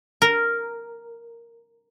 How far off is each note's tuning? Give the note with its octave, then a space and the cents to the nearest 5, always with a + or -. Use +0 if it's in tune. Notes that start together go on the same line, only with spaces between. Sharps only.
A#4 -5